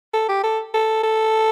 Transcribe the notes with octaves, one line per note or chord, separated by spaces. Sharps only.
A4
G4
A4
A4
A4